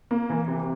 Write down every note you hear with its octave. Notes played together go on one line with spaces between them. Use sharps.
A#3
E3
C3